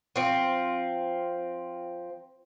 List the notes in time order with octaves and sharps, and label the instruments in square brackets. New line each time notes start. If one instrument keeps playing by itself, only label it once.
[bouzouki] F3 C4